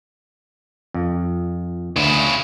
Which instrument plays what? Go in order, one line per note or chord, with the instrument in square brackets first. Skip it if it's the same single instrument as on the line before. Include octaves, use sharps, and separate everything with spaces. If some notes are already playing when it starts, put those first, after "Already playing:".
[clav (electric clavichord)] F2
[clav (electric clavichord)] D2 [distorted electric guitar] C#3 E4